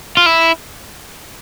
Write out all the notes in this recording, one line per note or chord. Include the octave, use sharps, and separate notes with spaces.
F4
E4